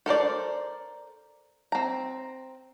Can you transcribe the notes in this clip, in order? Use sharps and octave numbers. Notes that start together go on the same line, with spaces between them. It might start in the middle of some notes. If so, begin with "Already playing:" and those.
A4 A#4 C5 D5
C4 A#5